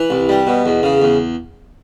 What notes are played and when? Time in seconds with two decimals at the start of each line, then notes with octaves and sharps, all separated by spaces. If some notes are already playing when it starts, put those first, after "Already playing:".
Already playing: E3
0.10 C2
0.29 G3
0.47 B2
0.66 E2
0.83 C#3
1.02 E2